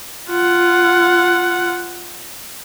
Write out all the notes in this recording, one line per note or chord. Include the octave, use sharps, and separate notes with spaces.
F4 F#5